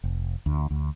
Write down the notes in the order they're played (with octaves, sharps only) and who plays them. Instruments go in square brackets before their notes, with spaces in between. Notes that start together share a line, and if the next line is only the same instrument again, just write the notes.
[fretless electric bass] F1
D2
D2